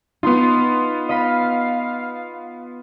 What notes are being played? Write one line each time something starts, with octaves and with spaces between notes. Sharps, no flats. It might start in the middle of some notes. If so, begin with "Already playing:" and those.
B3 D#4 F4 C6 D#6
D#5 F5 B5 B6